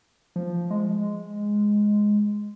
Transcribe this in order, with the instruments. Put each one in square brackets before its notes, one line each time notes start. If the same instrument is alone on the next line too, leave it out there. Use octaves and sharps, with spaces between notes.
[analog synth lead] F3
G#3